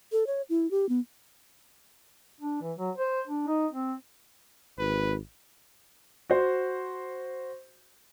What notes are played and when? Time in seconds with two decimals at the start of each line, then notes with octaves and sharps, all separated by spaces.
0.12 A4
0.27 C#5
0.49 E4
0.71 G4
0.89 B3
2.40 D4
2.62 E3
2.79 F#3
2.98 C5
3.28 D4
3.47 D#4
3.72 C4
4.79 G#1 B4
6.30 F#4 C5